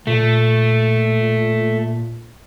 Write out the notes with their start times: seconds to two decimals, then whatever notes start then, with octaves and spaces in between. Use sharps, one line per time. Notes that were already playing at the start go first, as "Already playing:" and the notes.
0.07 A#2 A3